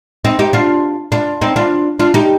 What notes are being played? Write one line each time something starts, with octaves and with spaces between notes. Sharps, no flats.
C4 D#4
D#4 G4
D4 F4
D4 F4
C4 D#4
D4 F4
D4 F4
D#4 G4